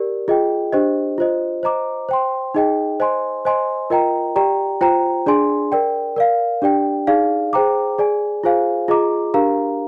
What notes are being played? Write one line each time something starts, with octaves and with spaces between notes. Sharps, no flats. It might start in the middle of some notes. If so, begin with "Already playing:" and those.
Already playing: G4 A#4 D5
F4 G#4 D#5 G5
D4 G4 C5 D#5
F4 C5 D#5
C5 D#5 A#5 D6
C5 G5 C6
D#4 G#4 D#5 G5
C5 D#5 G#5 C6
C5 D#5 G#5 C6
F4 A#4 D#5 G5 A#5
G4 D5 G5 A#5
F4 C5 G5 A#5
D4 G#4 D5 G#5 C6
A#4 D5 G5
A#4 D5 F5
D4 G4 D5 G5
D#4 G#4 D5 F5
G#4 C5 G5 A#5 D6
G#4 D5 G#5
F4 G#4 C5 F5 G#5
F4 G#4 D#5 A#5 D6
D4 G4 A#4 F5 A#5